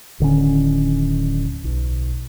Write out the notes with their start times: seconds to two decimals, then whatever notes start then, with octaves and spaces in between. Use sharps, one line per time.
0.20 D1 D3 D#3 C#4
1.64 B1